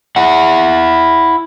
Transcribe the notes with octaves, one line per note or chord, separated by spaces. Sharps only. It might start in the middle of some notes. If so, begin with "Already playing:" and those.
E4 F#5